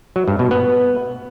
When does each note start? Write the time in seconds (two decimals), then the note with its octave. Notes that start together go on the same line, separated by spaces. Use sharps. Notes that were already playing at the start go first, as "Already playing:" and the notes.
0.16 F#3
0.28 G2
0.39 B2
0.51 B3